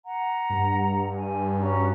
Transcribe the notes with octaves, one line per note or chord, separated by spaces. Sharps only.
F#5 A#5
G2
G#5
C#4 F#4 A#5